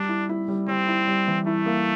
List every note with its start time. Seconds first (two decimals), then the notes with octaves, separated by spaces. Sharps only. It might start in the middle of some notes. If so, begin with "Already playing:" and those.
Already playing: G3 D4
0.09 E4
0.29 E4
0.48 G3
0.68 G3 C4
0.88 E4
1.07 G3
1.27 E3
1.47 A3 E4
1.66 A#3